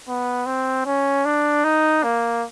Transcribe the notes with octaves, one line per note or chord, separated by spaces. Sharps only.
B3
C4
C#4
D4
D#4
A#3